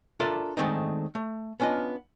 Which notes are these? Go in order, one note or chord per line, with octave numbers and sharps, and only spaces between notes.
D4 F4 A4 A#4 D5 E5
D#3 G#3 A3 C4 D4 D#4
A3
B3 C#4 D4 F4 D#5